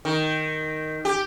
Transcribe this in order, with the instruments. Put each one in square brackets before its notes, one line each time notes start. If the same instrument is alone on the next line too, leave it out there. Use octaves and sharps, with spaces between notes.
[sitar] D#3
G4